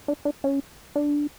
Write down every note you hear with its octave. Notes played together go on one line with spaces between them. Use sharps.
D4
D4
C#4
D4